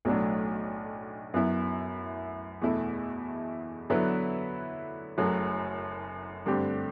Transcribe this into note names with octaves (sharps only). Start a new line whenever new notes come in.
B1 A2 F#3 A3 D4
F#2 F#3 B3 E4
E2 B2 A3 E4
D3 F#3 B3 E4 B4
F#1 F#2 F#3 A3
G2 D3 A3 C4 G4